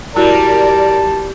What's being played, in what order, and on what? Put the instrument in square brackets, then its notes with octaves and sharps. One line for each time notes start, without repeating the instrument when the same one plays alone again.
[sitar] G3 [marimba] E4 F#4 [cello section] A#4 D5 [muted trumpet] A5